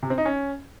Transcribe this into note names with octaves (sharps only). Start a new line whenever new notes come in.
C3
C4
D#4
C#4